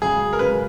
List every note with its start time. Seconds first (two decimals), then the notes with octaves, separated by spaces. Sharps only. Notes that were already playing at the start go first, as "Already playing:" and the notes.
0.02 F#2 C#3 G#3 G#4
0.33 A#4
0.39 F#2 C#3 G#3 B4